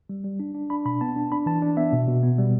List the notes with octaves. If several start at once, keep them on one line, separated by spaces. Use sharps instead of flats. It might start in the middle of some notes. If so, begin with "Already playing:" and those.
G3
G3
D4
D4
D4 B5
B2 B5
B3 A5
D4
D4 B5
E3 A5
D4
B3 E5
B2
B2
B3
G3